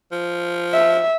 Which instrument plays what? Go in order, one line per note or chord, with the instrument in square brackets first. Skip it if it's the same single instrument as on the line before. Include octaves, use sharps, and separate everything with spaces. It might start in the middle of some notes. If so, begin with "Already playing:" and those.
[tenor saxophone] F3
[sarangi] E5